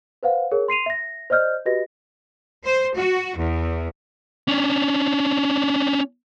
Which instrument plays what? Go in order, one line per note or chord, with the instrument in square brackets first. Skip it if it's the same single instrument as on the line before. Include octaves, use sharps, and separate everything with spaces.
[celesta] B4 C5 F5 F#5
G#4 A#4 C#5
C6 C7 D#7 F7
E5 A#6
C5 D5 D#5 F6 G6
F#4 G4 B4 D#5 A#6
[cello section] C5
F#4
E2
[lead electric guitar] C#4 D4